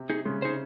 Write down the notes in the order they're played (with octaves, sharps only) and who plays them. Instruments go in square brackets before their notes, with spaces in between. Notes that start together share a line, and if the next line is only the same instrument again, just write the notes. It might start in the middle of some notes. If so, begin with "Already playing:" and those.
Already playing: [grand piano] C3
[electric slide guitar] D#4 G#4
[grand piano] C#3 [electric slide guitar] G#3
[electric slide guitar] D#4 G#4 C5